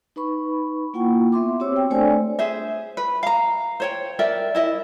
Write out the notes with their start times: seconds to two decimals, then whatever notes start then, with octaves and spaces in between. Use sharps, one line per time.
0.16 D#4 B4 B5 C#6
0.94 A#3 E4 F4 F#5 G5 C#6
1.32 B3 E5 C6 D6
1.60 C4 F#4 G4 C5 C#5 E6
1.76 G5
1.90 A3 D4 A4 C5 D5 G#5
2.39 G#4 C5 E5
2.97 B4
3.23 F5 A#5
3.80 C5 C#5 G5
4.19 A#4 D5 E5 G5
4.55 E4 D#5 E5